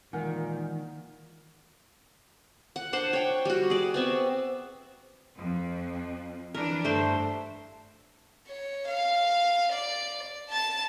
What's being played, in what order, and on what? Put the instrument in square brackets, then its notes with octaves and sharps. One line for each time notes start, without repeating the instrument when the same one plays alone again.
[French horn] A#2 [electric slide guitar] D#3 [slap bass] E3 G#3 A#3 [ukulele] A#4 F#5 G#5
[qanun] F#5
D4 C5 F#5
C#5 G5
G3 F#4
G#4 D5
B3 C4 E5
[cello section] F2
[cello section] E3 D4 [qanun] A#4
[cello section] G2 [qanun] A3 C5
[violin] C#5
F5
D5
A5 A6